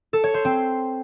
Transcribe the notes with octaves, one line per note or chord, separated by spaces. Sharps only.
A4
C#5
C5
C4